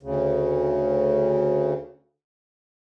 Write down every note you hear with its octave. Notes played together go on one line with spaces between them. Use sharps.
D2 C#3